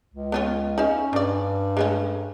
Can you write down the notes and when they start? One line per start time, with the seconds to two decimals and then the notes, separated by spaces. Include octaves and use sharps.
0.14 C#2
0.32 B3 C#4 F4
0.78 C#4 D#4 E5 F5
1.13 G2 D4 D5
1.77 G#3 A3 C#4